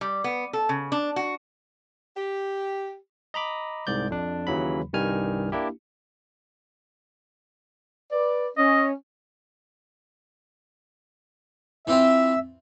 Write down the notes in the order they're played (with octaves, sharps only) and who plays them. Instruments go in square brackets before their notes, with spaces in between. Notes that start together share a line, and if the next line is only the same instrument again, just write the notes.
[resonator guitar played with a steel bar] G3
B3
A4
C#3
D4
F#4
[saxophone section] G4
[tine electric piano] D#5 A#5 B5 D6
C2 G#2 D5 G6
F2 D4
D#2 C#3 E3 F#3 B5
C2 G2 D#3 G3 G#5 F6
A#3 D4 E4 G4
[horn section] B4 D5
[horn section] C#4 [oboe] D#5
[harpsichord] E3 C4 F4 [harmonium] E5